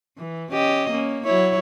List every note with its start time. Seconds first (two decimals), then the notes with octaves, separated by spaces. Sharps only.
0.17 E3
0.52 C#4 G4 D#5
0.90 A#3 C#4
1.24 F#3 E4 C#5